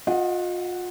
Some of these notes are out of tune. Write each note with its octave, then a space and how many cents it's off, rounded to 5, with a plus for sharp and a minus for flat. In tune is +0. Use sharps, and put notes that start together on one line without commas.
F4 +35 D#5 +5 F#5 +0